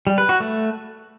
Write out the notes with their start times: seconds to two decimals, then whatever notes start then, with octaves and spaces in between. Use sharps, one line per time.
0.07 G3
0.18 B4
0.29 F#4
0.40 A3